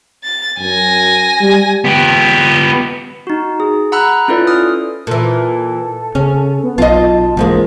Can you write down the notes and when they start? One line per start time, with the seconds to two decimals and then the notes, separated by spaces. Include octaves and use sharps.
0.24 A6
0.60 F#2 G#5 A#6
1.41 G3
1.84 B3 G4
3.27 D#4 F#4
3.60 G#4
3.92 F#5 A#5 B5 E6 F#6
4.28 C#4 E4 F4 A4 B4 D5
4.47 D#6 F6
5.07 A#2 E3 A4
6.15 C#3 C#4
6.63 B3
6.78 B1 F4 D#5 A5
7.37 A1 G#2 F3 G#3 A#3